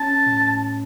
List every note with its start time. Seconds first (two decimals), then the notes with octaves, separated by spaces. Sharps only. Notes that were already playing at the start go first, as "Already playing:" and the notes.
Already playing: C#4 A5
0.26 A2